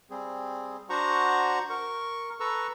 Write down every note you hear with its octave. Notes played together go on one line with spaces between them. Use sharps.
G3 C4 G#4
D4 F#4 C5 F#5 A#5 C#6
A#4 C#6
A4 B4 A#5 C#6 E6